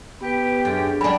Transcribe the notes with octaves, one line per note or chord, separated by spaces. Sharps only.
B3 G4 B4
F#2 D4 G#4 A4
F#3 G3 C#4 D4 B5